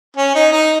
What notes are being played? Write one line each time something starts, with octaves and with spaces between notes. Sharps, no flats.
C#4
D#4
D#4